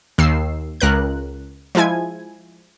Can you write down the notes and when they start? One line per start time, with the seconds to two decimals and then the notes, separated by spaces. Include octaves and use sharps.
0.18 D#2 E6 C7
0.81 C#2 A#4 F#6
1.75 F3 G#3 E4 G#5 G#6